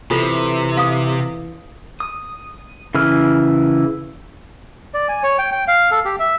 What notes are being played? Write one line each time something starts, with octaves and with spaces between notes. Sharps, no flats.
C3 E3 F4 A4
F5 D#6
D#6
C#3 E3 E4 F6
D5
G#5
C#5
G5
G5
F5
A4
G4
E5